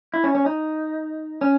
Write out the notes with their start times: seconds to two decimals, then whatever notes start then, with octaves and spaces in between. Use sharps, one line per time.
0.14 E4
0.24 C#4
0.35 C#4
0.46 D#4
1.41 C#4